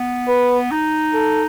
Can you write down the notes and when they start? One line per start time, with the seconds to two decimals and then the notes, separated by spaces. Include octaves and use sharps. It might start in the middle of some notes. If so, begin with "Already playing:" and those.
Already playing: B3
0.28 B4
0.71 D#4
1.14 A4